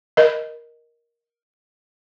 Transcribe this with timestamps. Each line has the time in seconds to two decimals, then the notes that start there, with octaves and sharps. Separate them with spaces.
0.17 A#4 D#5